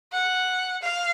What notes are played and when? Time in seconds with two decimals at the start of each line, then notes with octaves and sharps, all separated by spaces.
0.12 F#5
0.82 F5